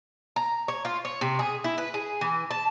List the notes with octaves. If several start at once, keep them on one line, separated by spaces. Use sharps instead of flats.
A#5
C#5
F4
C#5
C3
G#4
E4
B4
G#4
E3
A5